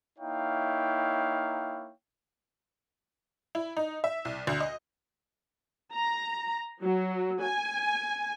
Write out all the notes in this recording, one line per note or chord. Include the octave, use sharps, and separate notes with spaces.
A#3 D#4 E4 C#5 F5 G5
E4
D#4
E5
C2
D2
D#5
A#5
F#3
G#5